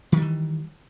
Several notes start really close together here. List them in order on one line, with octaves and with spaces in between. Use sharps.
D#3 G3 E3